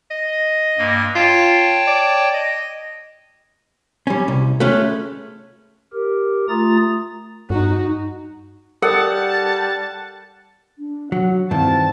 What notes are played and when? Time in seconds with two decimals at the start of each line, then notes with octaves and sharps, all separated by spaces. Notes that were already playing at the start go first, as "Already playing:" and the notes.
0.11 D#5
0.78 G2 A#3
1.15 F4 C#5 G5 A5
1.87 D5
2.34 D#5
4.07 G3 C#4
4.28 C2
4.60 G#3 A3 C#4 B4
5.93 G4 A#4
6.49 A3 F4 A#5 D#6 A6
7.50 G2 D#4 F#4
8.82 G3 A4 A#4 F#5 A5
10.79 D4
11.12 F#3 F#5
11.51 G2 D#3 E3 C4 A5